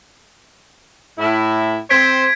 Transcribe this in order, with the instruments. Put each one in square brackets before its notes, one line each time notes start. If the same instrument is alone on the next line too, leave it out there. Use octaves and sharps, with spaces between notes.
[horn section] A2 E4
[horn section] C4 C5 [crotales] G#6 B6 D7